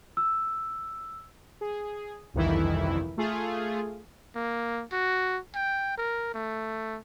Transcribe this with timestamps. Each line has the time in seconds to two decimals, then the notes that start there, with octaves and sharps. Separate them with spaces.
0.17 E6
1.61 G#4
2.34 G1 C2 F2 D#3 E3 E4
3.17 A3 F4 G#4
4.35 A#3
4.92 F#4
5.55 G5
5.98 A#4
6.34 A3